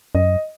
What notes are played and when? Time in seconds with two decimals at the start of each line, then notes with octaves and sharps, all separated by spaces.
0.15 F#2 D#5